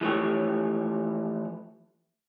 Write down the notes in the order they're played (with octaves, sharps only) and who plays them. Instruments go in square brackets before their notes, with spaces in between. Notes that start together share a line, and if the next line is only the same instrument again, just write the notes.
[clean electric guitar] E3 F3 A3 G4 C#5